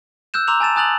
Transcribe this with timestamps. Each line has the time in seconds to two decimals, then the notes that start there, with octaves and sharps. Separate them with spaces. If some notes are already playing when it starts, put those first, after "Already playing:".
0.34 E6 F#6 G6 E7
0.48 A#5 C6 D6 E6 F7
0.60 G#5 A5 A6 E7
0.76 G#5 D#6 F#6 A6 F7 F#7